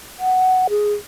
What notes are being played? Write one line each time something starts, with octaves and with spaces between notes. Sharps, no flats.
F#5
G#4